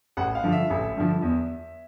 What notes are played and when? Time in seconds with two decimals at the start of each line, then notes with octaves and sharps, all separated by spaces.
0.17 A1 F#5
0.35 F5
0.43 G2 D3 F3
0.52 E5
0.70 A1
0.96 G2 D3 F3
1.22 E2